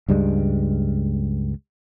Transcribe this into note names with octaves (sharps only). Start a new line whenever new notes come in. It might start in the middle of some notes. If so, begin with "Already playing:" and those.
C#2 G2 G3 G#3